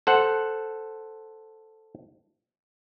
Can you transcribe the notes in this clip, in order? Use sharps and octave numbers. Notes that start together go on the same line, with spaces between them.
A4 C5 F#5